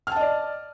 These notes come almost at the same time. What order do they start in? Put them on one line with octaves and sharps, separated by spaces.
F6 A5 D#5 D5